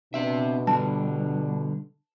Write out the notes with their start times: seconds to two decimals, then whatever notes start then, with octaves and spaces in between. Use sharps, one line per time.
0.14 B2 C4 D4 E5
0.67 D3 G3 A5